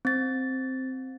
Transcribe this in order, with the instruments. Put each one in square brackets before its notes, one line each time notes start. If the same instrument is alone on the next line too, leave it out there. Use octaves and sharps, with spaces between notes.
[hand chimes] C4 A6